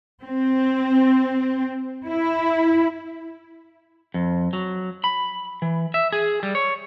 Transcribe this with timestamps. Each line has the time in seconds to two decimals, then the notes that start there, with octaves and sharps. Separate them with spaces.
0.24 C4
2.08 E4
4.14 F2
4.53 F#3
5.04 B5
5.62 E3
5.94 E5
6.12 G#4
6.43 G3
6.55 C#5